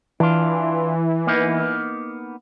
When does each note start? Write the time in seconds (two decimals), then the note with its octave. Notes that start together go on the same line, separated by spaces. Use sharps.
0.20 E3 D4 F4
1.27 A#3 B3 D#4